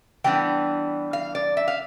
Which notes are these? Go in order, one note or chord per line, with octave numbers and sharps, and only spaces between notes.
E3 G3 B3 D4 G5
F5
D5
E5
F5